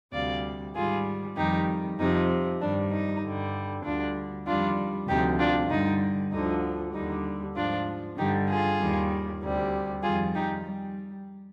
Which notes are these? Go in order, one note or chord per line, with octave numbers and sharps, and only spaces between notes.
D2 C3 G3 D5 F5
G#2 D#3 G3 F4 G#4
F2 D#3 G3 D#4 G4
F2 C3 F3 D#4
G2 D#3 G3 D4
D#4
G2 D3 G3
D2 D3 G3 D4 F4
F2 D#3 G3 D4 F4
D2 C3 F3 D#4 G4
D4 F4
G2 D3 G3 D#4
D2 D3 F3 D#4
D#2 D3 G3 D#4
G#2 F3 D4 F4
G2 D3 G3 D#4 G4
F4 G#4
D#2 D#3 G3
D2 C3 G3
F2 D#3 G3 F4 G#4
D#4 G4
G3